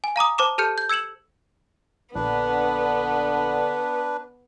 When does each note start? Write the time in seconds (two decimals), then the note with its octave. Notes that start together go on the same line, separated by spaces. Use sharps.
0.04 G#5
0.16 F5 A#5 D6 D#6
0.38 C5 A5 D6 E7
0.58 G4 A4 A5 F6 G6 C#7
0.78 G6
0.89 E6 G#6 C#7 E7 F#7
2.15 A#1 D3 B3 D4 B4